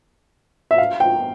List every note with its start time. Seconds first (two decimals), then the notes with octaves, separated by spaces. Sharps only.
0.71 E5
0.78 F5
1.00 G5